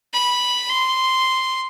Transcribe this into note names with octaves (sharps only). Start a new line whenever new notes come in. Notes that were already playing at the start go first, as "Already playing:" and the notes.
B5
C6